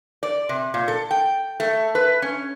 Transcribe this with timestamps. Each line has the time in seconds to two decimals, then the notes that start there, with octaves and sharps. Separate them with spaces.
0.23 D5
0.49 C3
0.74 A#2
0.88 A4
1.11 G5
1.60 A3
1.95 B4
2.22 C#4